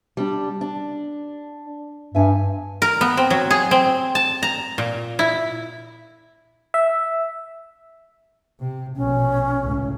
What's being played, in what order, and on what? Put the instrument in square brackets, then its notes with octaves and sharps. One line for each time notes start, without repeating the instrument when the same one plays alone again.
[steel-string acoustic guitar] G3 D4
D4
[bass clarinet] G2 [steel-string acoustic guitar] E5 G#5
[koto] A#4
B3
C4
F#3
G#4
C4
A5
A#5
A#2
E4
[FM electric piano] E5
[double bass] C3
[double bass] A#1 B2 [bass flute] C#4
[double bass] C#2 A2